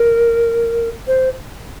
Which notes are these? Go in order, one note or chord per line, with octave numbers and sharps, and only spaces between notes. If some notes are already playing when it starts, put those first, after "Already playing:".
Already playing: A#4
C5